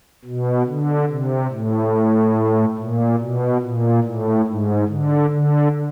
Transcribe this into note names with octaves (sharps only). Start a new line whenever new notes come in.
B2
D3
C3
A2
A#2
B2
A#2
A2
G#2
D3
D3